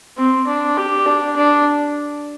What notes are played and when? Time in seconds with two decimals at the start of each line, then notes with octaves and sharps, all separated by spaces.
0.18 C4
0.47 D4
0.77 G4
1.06 D4
1.36 D4